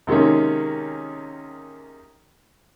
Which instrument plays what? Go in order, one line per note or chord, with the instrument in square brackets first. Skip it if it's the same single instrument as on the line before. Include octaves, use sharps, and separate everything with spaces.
[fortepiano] C3 D#3 G#3 A#3 C#4